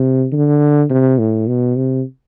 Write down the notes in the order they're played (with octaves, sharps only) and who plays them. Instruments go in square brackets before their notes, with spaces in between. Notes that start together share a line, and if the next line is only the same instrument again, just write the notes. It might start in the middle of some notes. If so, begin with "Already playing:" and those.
Already playing: [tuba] C3
D3
C3
A2
B2
C3